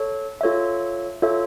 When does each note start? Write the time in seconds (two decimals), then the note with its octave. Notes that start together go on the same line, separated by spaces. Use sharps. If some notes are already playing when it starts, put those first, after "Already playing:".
Already playing: A4 C#5
0.41 F4 A4 C#5 E5
1.22 F4 A4 C#5 E5